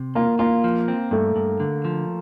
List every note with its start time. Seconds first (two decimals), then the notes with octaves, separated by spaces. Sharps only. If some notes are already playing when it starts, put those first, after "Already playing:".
Already playing: C3
0.15 A#3 F4
0.39 A#3 F4
0.64 F3
0.88 C4
1.11 G2 A3
1.36 G2
1.60 D3
1.85 F3